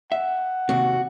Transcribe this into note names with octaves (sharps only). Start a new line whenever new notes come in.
E5 F#5
D#2 C3 F#4